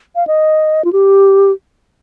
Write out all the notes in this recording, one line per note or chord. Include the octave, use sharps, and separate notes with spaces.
F5
D#5
F4
G4